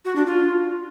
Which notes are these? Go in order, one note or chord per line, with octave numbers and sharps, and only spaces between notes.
F#4
D4
F4